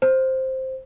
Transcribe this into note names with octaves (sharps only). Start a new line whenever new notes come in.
C5